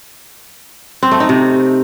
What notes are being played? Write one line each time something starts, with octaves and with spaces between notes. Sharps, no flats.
C4
A3
D#4
C3